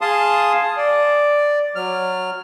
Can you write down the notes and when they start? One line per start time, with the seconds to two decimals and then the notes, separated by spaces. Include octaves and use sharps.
0.01 G#4 F5 A5 C6 D#6
0.77 D5
1.76 F#3 F6